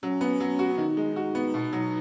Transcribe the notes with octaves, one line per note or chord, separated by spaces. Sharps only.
F#3 C#4
B3
F#3
F#4
D#3 D#4
G#3
D#4 F#4
B3
B2
F#3